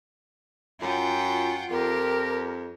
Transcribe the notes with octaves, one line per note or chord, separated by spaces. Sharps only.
F#2 F4 F#5 G5
F2 G4 A#4